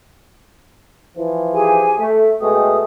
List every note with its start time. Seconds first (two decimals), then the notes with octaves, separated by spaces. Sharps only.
1.16 E3 F3
1.53 G4 G#4 G#5
1.98 A3 E5
2.41 B2 G#3 A3 G5 D#6